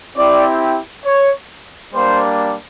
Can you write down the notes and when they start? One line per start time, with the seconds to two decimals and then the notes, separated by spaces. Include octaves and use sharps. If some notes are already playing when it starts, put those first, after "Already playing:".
0.16 C4 E4 G4 D5
1.04 C#5
1.94 G3 A#3 D4 C5